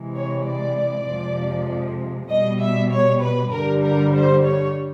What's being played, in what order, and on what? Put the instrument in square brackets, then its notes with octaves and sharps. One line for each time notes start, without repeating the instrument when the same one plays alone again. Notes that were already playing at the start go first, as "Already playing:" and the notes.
Already playing: [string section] C3 E3 G#3
C#5
D5
F2 C3 F3 G#3
B2 G3 D#5
E5
C#5
B4
G2 D3 G3 A#4
A#4
C5
C#5